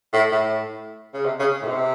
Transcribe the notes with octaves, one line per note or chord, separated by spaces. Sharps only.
A2
A2
C#3
C3
C#3
A2
C3